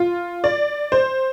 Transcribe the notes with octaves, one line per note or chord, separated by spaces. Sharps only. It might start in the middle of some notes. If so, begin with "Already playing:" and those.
Already playing: F4
D5
C5